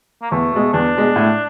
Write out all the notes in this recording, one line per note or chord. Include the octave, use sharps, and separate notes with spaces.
A#3
E2 A3
B2 G#3
E2 D4
B2 G#3
A2